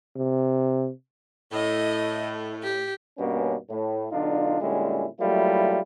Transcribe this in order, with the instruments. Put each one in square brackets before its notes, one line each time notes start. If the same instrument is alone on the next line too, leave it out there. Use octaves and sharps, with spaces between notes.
[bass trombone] C3
[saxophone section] A2 [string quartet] D#5
[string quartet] G4
[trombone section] G2 B2 A#3 C#4
A2
B1 D3 D4 D#4 F4
A#2 D3 G3 G#3 C#4 E4
F#3 G3 A3 A#3 E4 F4